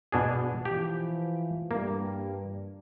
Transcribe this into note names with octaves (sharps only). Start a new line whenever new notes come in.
B2 D4 G#4
E3 F3 F4 G4
G2 A#3